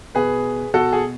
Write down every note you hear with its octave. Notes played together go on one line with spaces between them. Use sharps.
B2 G#4 B4
B2 F#4 A4
G#4